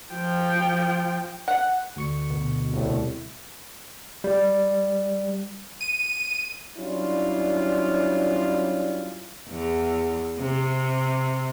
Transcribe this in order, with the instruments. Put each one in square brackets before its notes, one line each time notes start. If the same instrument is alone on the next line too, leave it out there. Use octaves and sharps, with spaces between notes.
[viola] F3 G5
[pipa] F#5
[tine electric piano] D2 C#6 C#7
[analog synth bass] B2
[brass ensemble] C2 A2
[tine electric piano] G3
[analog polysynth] D#7
[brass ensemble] F#3 G3 C#4 D4 E4 F4
[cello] E2
C3